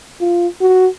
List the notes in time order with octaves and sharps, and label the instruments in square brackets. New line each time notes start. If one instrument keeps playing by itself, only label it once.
[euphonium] F4
F#4